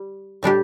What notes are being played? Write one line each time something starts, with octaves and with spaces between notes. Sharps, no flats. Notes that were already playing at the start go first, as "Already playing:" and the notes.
Already playing: G3
A2 G3 D4 G4